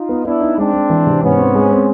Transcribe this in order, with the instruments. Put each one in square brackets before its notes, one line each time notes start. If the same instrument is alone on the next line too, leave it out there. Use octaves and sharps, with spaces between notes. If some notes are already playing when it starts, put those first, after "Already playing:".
Already playing: [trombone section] D#4 F4
[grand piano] B3
[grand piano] B3 [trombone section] D4 E4
[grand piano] D#4
[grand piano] G#3 [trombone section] C4 D4
[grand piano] G#3
E3
C3
[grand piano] G#2 [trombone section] B3 C#4
[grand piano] C4
G#3
C4